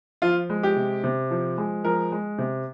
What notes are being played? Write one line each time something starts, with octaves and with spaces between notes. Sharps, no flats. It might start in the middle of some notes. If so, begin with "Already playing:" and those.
F3 F4
G#3
G4
C3
C3
F3
G#3
F3 A#4
G#3
C3